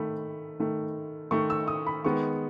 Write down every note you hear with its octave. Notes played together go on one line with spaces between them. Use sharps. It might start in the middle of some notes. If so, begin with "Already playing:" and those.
Already playing: D#3 A3 B5
D#3 A3
D#3 A3 C#6
E6
D#6
B5
D#3 G#3 B3 C#6